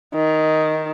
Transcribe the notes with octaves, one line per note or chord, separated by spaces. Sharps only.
D#3